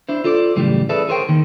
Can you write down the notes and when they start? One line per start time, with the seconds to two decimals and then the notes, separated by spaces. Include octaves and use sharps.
0.09 D4 E4 C5
0.24 F4 A4 C5 D5
0.56 F#2 A2 C#3 E3 G3
0.89 E4 G#4 A4 B4 D5
1.09 G#4 A#4 C5 C#5 E5 G5
1.29 D#2 D#3